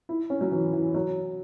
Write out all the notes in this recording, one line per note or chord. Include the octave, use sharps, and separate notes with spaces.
E4
C#4
F#3
E3
E3
F#3